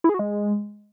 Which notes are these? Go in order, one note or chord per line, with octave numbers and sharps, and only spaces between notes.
E4
G#4
F#4
G#3